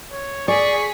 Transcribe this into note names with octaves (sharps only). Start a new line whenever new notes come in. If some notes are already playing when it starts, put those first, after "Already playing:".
C#5
G#4 D5 C#6 B6